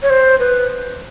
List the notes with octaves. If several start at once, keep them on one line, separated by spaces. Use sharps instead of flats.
C#5
C5
B4